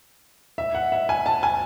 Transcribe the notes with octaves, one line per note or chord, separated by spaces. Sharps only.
E5
F#5
E5
G#5
A5
G#5